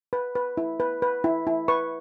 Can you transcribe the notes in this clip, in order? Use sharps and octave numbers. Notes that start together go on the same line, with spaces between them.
B4
B4
E4
B4
B4
E4
E4
B4 C#6